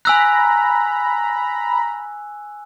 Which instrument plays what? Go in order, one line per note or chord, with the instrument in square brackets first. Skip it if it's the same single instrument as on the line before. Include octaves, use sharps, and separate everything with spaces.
[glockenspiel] G#5 E6 F#6 [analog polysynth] A#5 B5